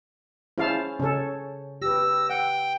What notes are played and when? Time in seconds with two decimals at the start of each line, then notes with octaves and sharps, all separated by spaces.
0.58 C#4 E4 G#4 C5 F5 A5
0.99 C#3 C#4 A4 C#5
1.82 G4 B4 E6 A#6
2.29 F#5 G5